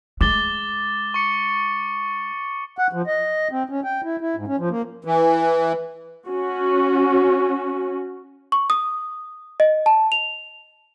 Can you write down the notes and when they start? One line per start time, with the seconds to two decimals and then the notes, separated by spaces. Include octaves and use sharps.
0.21 G#3 D6 A6 G7
1.14 C#6 C#7
2.78 F#5
2.93 F3
3.07 D#5
3.51 C4
3.69 C#4
3.84 G5
4.04 E4
4.21 E4
4.36 G#2
4.47 C#4
4.59 F3
4.70 A#3
5.05 E3
6.27 C#4 F#4
8.52 C#6
8.70 D#6
9.60 D#5
9.86 A5
10.12 F7